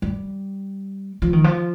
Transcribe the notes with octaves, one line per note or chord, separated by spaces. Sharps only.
G3
F3
D#3
F3